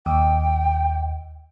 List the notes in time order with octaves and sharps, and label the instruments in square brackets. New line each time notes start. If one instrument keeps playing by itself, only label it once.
[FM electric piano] D#2 [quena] G5